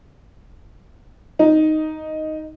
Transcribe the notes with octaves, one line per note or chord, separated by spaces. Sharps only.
D#4